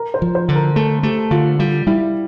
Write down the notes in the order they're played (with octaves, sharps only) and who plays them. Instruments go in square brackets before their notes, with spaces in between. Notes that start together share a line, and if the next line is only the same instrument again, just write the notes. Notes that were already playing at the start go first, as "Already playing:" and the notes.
Already playing: [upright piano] A#4
C5
[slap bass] F3
[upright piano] C5
[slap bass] D3
[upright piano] A#4
[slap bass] A3 [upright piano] A4
[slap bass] A3 [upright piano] G4
[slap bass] D3 [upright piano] F4
[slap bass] G3 [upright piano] F4
[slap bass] G3 [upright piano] E4